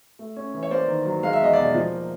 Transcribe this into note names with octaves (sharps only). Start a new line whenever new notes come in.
A3
C#4
E3
C#5
A#3 C5 D5
D#3
F#3
G#3 F5
E5
E2 D#5
B2 D5 E5
F3
A#3